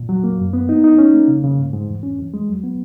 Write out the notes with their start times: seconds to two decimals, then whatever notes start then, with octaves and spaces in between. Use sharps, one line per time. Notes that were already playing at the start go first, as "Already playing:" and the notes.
Already playing: A#2
0.09 F#3
0.24 A#3
0.38 F#2
0.53 B3
0.69 D#4
0.84 D#4
0.98 C#4
1.14 A#3
1.28 C#3
1.44 C#3
1.59 G#2
1.73 G#2
1.88 E2
2.03 C#4
2.18 E2
2.34 G#3
2.48 F#3
2.64 B3